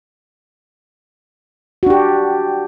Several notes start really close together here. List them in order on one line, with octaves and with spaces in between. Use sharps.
F#4 D4 G4